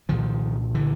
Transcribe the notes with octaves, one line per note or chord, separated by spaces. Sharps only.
C2 A#2 D#3 F3
D3 E3